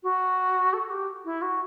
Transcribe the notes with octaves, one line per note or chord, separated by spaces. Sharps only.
F#4
A4
G4
E4
F#4